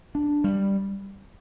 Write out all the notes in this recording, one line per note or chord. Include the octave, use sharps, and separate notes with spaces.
D4
G3